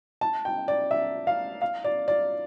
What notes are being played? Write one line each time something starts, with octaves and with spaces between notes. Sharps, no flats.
A5
G5
D5
E5
F5
F5
D5
D5